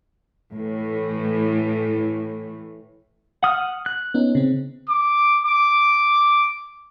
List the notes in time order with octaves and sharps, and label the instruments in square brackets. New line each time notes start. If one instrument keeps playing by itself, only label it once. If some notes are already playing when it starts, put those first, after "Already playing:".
[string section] A2 E3
[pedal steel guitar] F#5 D#6 F6
F#6
[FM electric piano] B3 C#4 D#4
C#3 C4
[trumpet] D6
D6